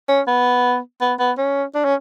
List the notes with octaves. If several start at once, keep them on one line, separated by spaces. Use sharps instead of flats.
C#4
B3
B3
B3
C#4
D4
C#4